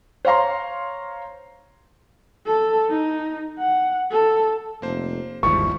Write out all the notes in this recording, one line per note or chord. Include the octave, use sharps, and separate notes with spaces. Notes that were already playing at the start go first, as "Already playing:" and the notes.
C5 C#5 F5 A#5 C6
A4
D#4
F#5
A4
F1 A#3 C5
G1 D#2 G#2 F3 G3 E4 C#6